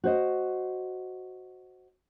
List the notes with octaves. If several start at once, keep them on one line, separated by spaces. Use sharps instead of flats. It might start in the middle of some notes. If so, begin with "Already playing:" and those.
F#4 C5 D#5